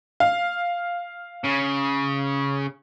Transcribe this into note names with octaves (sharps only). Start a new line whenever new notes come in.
F5
C#3